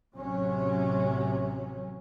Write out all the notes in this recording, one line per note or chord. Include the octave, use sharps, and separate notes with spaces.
A1 C3 F#3 C#4